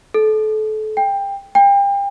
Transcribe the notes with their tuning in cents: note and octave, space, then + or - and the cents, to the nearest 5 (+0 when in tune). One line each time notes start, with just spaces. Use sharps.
A4 -30
G5 +20
G5 +35